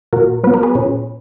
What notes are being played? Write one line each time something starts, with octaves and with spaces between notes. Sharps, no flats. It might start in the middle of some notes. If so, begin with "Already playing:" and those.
A#2 F#4 A#4
F#3 B3 B4
A#4
G#4 B4
A#2 C#4